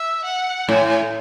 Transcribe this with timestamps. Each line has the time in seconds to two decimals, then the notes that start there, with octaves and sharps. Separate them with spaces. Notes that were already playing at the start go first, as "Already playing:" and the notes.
Already playing: E5
0.24 F#5
0.69 A2 G#5